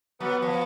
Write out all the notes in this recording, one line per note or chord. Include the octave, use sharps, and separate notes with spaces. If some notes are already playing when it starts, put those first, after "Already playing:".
F#3 B3
F3